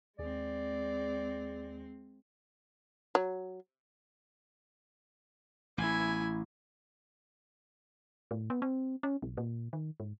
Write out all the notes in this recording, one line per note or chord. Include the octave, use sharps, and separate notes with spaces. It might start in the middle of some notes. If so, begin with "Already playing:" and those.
D#2 G#3 C4 G#4 D5
F#3
A1 E4 G#5
A2
B3
C4
C#4
B1
A#2
D#3
G#2